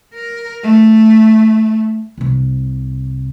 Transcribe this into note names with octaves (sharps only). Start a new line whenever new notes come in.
A#4
A3
C2 C3